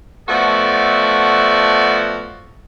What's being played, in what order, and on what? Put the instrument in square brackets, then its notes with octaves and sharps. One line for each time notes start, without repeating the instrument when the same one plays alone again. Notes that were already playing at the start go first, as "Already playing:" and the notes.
[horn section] F3 A3 B3 F#4 A4 D5